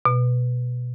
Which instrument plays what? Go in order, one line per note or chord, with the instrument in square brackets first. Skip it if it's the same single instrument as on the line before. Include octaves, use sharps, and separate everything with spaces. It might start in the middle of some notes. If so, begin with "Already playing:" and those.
[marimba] B2